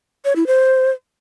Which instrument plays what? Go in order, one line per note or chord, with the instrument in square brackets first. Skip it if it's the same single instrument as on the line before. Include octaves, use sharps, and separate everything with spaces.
[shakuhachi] C#5
E4
C5